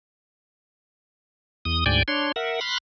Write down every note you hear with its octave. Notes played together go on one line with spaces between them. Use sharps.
E2 D#6
D2 G#2 D5 G5 G#5
D4 C#5 C6
A#4 E5 F#5
B5 C6 F6 F#6